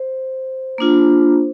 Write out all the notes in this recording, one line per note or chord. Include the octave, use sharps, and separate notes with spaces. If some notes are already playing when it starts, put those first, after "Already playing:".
Already playing: C5
A#3 D4 F4